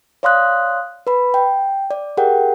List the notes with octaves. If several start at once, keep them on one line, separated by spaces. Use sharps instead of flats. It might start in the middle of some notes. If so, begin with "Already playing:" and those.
C#5 D5 F5 C6 D#6 F#6
B4 B5
G5
D5
G4 G#4 A#4 F#5 G5